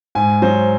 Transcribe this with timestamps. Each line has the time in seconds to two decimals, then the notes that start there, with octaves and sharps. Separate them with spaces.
0.15 G#2 G#5
0.42 F#3 C5